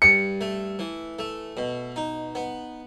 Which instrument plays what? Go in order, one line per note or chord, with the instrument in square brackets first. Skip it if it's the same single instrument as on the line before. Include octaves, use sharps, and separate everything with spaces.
[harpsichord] G2 [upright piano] C#7
[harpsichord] A3
E3
A3
B2
D#4
B3